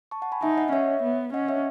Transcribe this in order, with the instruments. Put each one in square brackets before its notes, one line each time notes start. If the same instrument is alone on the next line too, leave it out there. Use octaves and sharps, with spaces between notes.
[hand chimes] A5 C#6
F#5 A5
G#5 B5
[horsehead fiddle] D#4 [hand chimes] E5 G#5
[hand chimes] D#5 F#5
[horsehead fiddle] C#4 [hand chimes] C#5 E5
[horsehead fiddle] B3
[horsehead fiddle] C#4 [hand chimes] D#5 F#5
[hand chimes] C#5 E5